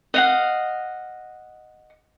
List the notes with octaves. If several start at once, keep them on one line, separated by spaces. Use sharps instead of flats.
D#5 F5 F#5